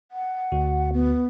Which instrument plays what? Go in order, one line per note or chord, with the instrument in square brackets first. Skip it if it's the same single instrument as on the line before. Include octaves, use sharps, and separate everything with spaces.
[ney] F#5
[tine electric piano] D2 F#4
[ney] B3